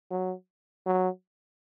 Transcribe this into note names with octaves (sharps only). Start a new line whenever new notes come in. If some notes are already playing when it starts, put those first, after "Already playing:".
F#3
F#3